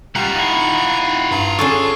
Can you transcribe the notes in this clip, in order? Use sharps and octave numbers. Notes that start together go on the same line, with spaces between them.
G3 F4 F#5 A#5
D#4 E4
G2 A#5
C#4 D4 G#4 A4 C#6